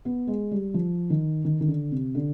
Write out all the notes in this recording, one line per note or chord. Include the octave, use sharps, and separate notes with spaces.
B3
G#3
G3
F3
D#3
D#3
D#3
D3
C3
D3